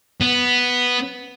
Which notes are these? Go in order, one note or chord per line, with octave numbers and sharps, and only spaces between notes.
B3